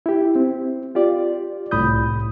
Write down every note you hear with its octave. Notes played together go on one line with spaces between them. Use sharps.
E4 G4
C4
F4 G4 D5
C2 A2 B5 D#6 G6